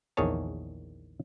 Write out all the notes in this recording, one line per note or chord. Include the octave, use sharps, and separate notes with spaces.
A#1 E2 D#3 G#4 C#5 A5